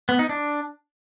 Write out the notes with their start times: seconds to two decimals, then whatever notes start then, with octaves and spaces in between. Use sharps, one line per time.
0.09 B3
0.19 D#4
0.29 D4